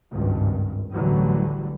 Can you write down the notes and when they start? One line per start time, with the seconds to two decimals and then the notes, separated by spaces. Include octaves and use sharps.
0.10 G#1 C#2 G2
0.92 A1 D2 D3 E3 F#3 G3